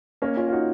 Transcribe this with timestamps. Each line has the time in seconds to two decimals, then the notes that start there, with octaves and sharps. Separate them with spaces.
0.22 A#3 C#4
0.37 C#4 F4
0.48 F4
0.52 D#4 F#4